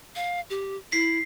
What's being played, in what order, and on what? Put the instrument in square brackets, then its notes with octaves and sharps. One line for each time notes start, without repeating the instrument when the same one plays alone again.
[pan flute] F5
G4
[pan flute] E4 [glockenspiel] B6 C7